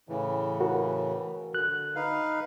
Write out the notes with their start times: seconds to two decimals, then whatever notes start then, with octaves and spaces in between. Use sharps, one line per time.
0.09 A2 C#3 E3
0.60 F#4 A#4
1.54 D3 F#6
1.95 D#4 B4 F5